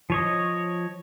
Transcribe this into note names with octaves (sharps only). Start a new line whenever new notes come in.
F3 C#5 D#5